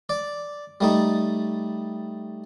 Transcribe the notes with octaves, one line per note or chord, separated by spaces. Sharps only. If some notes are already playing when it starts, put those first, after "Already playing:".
D5
G3 A3 D#4